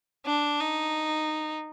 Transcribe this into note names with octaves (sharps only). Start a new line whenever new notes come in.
D4
D#4